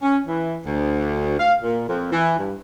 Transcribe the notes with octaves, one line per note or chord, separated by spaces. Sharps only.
C#4
E3
D2
F5
A#2
F2
E3
G2